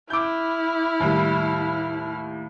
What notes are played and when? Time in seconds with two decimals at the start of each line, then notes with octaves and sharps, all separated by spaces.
0.10 E4 D6 F6 G6
1.00 D#2 A2 G3